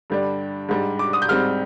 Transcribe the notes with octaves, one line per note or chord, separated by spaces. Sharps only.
G2 D3 G3 D4
G#2 G3 D4
D6
D#6
G6
G#2 G3 C4 F6